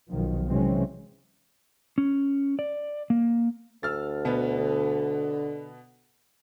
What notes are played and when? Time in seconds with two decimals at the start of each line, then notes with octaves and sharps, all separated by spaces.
0.10 B1 D#3 F3
0.50 C3 E3 F#3 G#3 C4 C#4
1.98 C#4
2.59 D5
3.10 A#3
3.83 D2 E6 F6 A6
4.25 B2 B3
4.58 D3